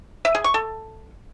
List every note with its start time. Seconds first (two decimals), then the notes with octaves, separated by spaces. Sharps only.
0.25 E5
0.35 G#4
0.44 C#6
0.54 A4